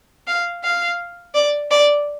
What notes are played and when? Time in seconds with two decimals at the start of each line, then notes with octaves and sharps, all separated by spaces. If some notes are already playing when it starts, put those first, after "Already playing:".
0.27 F5
0.64 F5
1.35 D5
1.71 D5